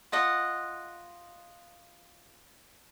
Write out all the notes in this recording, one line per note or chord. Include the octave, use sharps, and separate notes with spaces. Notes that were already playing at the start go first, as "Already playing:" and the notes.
F4 D#5 F#5